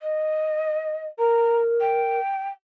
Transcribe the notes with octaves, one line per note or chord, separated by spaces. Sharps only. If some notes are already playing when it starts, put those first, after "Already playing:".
D#5
A#4 A#5
G5